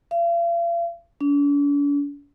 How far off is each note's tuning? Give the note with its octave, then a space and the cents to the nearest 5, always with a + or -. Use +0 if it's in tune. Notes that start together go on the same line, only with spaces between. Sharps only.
F5 -40
D4 -45